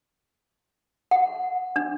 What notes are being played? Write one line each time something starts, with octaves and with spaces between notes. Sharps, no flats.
F#5
D4